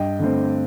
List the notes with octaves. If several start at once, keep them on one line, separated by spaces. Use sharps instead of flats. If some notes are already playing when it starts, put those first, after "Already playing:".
Already playing: G2 D#5 G5
D3 A3 C4